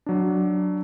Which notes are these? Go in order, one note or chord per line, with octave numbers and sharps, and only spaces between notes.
F#3 D4